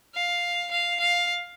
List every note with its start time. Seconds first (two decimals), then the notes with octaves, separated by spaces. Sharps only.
0.15 F5
0.71 F5
1.00 F5